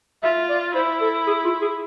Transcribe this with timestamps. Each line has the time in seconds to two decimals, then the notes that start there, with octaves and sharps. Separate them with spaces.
0.23 F4 E5
0.49 D5
0.75 E4 C5
1.01 A4
1.27 G#4
1.44 F4
1.62 G#4